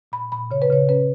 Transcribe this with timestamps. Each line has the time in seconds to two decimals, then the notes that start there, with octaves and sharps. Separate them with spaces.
0.12 A#2 B5
0.32 A#2 B5
0.51 C#3 C#5
0.62 B4
0.70 C#3 C#5
0.89 C#4 B4